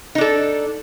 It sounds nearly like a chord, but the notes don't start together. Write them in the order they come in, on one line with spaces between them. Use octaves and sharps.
D#4 D4 A4